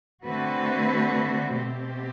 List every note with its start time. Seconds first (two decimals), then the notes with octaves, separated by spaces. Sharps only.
0.24 D3 A3 C4 F#4 B4
1.56 B2 A3 C4 G4